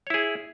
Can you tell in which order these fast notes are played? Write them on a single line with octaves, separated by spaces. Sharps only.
C#5 E4 G#4